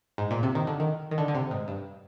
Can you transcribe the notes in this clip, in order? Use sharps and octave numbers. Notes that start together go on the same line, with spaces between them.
G#2
A#2
C3
D#3
D3
D#3
D#3
D3
D3
C3
G#2
G2